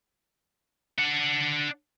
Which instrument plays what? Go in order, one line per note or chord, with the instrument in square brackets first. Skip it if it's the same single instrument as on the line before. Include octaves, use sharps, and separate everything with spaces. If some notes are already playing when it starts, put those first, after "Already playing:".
[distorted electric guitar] D4 F#5